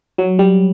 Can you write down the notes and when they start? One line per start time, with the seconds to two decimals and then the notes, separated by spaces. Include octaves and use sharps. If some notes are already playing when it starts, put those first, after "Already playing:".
0.18 F#3
0.39 G3